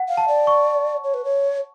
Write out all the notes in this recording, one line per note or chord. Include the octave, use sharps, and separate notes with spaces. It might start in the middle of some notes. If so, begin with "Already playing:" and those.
Already playing: F#5
F5
A5
D5
C#6
C#5
B4
C#5